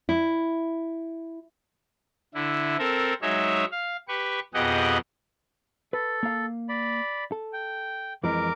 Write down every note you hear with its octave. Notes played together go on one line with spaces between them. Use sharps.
E4
D3 E4
C4 A4 A#4
F#3 G#3 D#4 C#5 E5
F5
G4 B4 C#6
F2 B2 G4 G#4 D#5 F#5
A4 B4
A#3 F5
D5 B5
A4
G5
F2 E3 G#3 A#4 D6